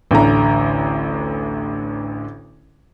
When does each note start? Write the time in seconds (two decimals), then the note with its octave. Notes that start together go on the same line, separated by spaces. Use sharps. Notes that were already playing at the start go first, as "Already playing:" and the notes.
0.11 A1 D2 D3 A#5